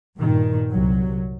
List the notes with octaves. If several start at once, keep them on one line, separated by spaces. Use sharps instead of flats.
G2 A#2 D#3
C2 F#3